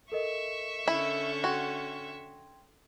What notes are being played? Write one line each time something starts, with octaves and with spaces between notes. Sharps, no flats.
A4 A#4 D#5 E5 C#6
D3 C#4 E4
F#4 G5 C6 G#6